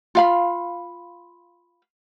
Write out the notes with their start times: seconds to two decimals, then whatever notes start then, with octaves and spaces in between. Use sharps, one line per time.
0.15 F4 F5 B5